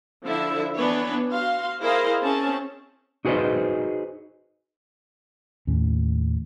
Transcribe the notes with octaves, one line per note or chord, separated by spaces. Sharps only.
D3 F3 E4 E5
E3 B3 D4 B4 C#5
F#4 F5 C6
E4 G#4 A#4 C5 D#5 F5
C4 C#4 G#4 A5
D#4 F#4 G#4 B4 C5 D#5
D#2 A2 C#4